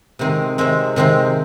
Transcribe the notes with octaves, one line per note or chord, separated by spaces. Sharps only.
C3 D#3 G#3 C4
C3 D#3 G#3 C4
C3 D#3 G#3 C4